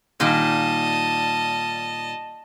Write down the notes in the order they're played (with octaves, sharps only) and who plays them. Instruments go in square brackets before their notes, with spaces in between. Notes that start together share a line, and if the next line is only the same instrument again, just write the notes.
[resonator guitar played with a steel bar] A#2 D#3 G3 [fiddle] D#5 A5